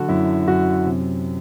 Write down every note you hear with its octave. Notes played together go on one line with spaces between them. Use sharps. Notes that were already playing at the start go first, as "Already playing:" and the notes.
Already playing: D3 F#3 F#4 A4
F#2 E4
F#2 F#4
C3